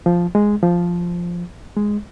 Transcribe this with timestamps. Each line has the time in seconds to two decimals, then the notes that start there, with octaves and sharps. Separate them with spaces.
0.06 F3
0.35 G#3
0.63 F3
1.76 G#3